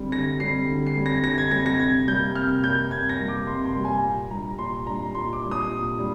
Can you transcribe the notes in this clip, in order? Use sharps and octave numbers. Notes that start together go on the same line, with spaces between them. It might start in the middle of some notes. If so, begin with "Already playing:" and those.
Already playing: D3 G3 C4
D3 A#6
G3 C4 C7
D3
C7
G3 C4
A#6
D3 A#6
G#6
G3 C4 A#6
A#6
C3 G#6
G3 A#3 G6
C3 F6
G3 A#3 G6
C3 G#6
A#6
G3 A#3
D6
C3 C6
C6
G3 A#3
G#5
A#2
G3 D4 A#5
A#2 C6
G3 D4 A#5
A#2 C6
D6
G3 D4
D#6
A#2
G3 D4